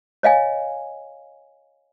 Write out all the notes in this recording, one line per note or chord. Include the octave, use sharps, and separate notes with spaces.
C#5 D#5 F5 G#5